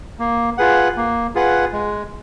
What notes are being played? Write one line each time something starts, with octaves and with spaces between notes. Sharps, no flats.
A#3
F4 G#4 B4 F#5
A#3
F4 G#4 B4 F#5
G#3